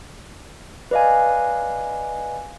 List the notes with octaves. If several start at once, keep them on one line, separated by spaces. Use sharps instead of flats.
B4 D5 D#5 F5 G#5